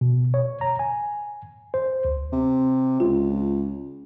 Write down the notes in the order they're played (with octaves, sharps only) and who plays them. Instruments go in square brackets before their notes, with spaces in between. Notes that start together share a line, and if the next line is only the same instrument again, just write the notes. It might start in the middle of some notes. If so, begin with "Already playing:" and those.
[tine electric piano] B2
C#5
A#5
G#5
C5
D2
[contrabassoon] C3
[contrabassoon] C#2 [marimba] F4